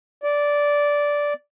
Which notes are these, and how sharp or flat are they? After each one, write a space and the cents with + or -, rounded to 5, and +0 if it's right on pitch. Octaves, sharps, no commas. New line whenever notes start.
D5 -10